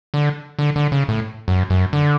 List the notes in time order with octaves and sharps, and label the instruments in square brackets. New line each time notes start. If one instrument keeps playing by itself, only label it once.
[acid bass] D3
D3
D3
C#3
A2
F#2
F#2
D3